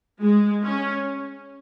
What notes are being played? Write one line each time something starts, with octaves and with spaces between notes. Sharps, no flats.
G#3
C#4